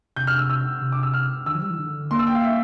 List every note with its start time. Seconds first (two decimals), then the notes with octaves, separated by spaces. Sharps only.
0.16 C3 G6
0.27 F6
0.38 E6
0.50 E6
0.81 C3
0.92 D6
1.03 E6
1.14 F6
1.46 D3 E6
1.54 F3
1.62 G3
1.70 E3
1.79 D3
2.11 A#3 C6
2.19 E6
2.27 G5
2.35 F5
2.44 E5